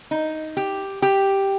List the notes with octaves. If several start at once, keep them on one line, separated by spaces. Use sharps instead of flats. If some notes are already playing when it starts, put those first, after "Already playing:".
D#4
G4
G4